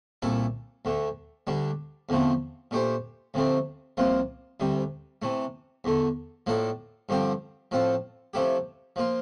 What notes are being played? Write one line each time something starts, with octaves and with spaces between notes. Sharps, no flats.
C2 A#2 A3 E4 A4
D2 D3 A3
D2 D3 G3 D4
E2 D3 F3 A3 C4
A#2 A3 D4 G4 C5
D2 C3 F3 A3 C4
C2 C3 F3 A#3 F4
D2 C3 G3
C3 E3 A3
E2 D3 A3
A2 F3 A#3 D4 A4
G2 D3 F3 C4 G4
A2 F3 C4 F4 A4
C3 F3 A3 E4 G4
F3 A#3 F4